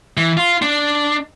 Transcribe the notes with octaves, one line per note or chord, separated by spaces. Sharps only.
E3
F4
D4